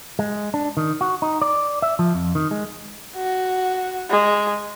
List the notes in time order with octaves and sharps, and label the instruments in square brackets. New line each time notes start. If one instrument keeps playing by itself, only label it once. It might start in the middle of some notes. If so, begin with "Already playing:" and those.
[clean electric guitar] G#3
D4
D#3
F#4
D#4
D5
E5
F3
F2
D#3
G#3
[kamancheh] F#4
G#3